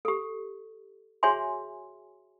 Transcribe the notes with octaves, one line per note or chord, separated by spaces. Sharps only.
G4 A4
F#4 G#4 C#5 E5 G#5 C6